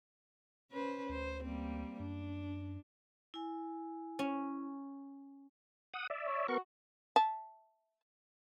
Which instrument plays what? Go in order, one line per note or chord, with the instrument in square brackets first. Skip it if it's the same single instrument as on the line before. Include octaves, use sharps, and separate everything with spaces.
[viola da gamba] C#4 B4 C5
[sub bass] D2 [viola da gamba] C5
[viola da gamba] G3 A#3 C4
[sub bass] F#2 [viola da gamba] D4
[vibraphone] E4 G#5
[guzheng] C#4
[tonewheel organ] F#5 D#6
D5 E5
[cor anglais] C#5
[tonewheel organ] B3 A#4 C#6 [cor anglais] F#4
[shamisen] E5 A5